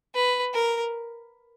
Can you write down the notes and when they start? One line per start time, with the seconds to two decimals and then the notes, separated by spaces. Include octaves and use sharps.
0.15 B4
0.53 A#4